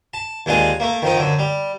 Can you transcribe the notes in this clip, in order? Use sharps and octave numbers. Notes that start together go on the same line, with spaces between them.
A5
D#2 G#3 D4 F4 G#5
A3 A#3
D#3 F3 D#4
F#2 D3
G3